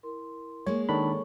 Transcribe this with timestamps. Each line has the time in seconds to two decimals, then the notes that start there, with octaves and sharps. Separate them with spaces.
0.03 E4 A#4 C6
0.67 G#3 A#3 C#5
0.89 D#3 D4 A4 C#5 B5 C#6